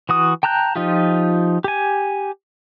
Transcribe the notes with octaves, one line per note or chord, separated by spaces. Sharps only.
E3 F#4 D#6
G5 A5 A#5 F#6 G6
F3 D#4 F4 G4
G4 G#5